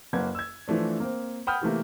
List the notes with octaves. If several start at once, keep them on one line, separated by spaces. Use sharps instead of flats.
F#1 A#3 B4 F#5 G#6
E6 G#6
E3 F3 A3 D4
A#3 C4
F#5 G5 B5 D#6 F6 G6
C3 E3 A3 A#3